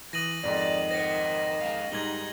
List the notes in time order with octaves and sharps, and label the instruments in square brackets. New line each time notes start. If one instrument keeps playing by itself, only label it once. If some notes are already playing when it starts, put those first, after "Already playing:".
[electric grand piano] E3 D#6 [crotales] A#6 D#7 F#7
[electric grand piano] F2 G#2 [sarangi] D#3 [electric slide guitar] D5
[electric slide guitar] C5 F#5 [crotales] A#6
[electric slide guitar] G#3 F5
[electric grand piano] G#2 G3 [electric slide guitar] D#4 [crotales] G#6 F#7 G7